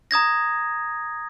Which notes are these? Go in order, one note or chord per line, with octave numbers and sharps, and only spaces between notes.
A#5 D#6 G#6 A#6